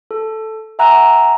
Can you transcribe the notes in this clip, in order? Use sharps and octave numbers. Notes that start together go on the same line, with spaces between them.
A4
E5 F#5 G#5 A#5 E6 F#6